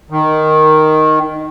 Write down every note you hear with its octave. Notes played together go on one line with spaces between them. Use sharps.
D#3